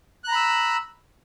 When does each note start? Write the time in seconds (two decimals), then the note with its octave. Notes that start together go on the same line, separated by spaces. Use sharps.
0.24 F#6
0.28 A#5
0.32 B5
0.36 E6